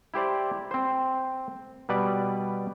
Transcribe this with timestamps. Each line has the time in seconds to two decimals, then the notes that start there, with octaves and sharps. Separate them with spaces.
0.14 E4 G4 C5 D5
0.71 C4 C5
1.89 B2 G3 B4 D5